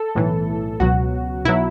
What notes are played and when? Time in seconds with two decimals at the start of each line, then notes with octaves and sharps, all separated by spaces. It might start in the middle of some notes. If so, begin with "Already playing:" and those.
Already playing: A4
0.15 B1 A2 E3
0.80 C#2 B2 F#3 F#4
1.45 B1 B2 F#3 E4